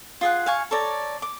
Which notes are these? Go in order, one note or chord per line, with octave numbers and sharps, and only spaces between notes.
F4 G#4 F#5
F5 G#5 C#6
A4 C#5 D5 A#5
D6